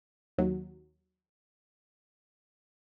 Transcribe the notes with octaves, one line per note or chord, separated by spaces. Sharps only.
D#2 F#3